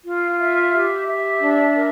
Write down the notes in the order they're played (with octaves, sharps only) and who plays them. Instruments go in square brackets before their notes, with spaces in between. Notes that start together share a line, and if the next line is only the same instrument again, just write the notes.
[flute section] F4
E5
G4
E5
D4
A#4